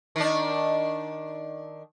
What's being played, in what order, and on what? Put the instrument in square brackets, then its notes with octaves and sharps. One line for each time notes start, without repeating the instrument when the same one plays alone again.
[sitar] D#3 D4